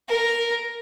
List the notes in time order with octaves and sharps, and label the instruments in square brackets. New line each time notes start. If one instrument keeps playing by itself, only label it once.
[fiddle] A#4